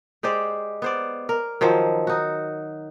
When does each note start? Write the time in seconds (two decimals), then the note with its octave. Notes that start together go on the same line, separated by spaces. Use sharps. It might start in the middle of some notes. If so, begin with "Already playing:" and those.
0.23 G#3 G4 C5 D5
0.82 B3 C5 D5
1.29 A#4
1.61 D#3 F3 F#3 C5
2.07 D#4 F#4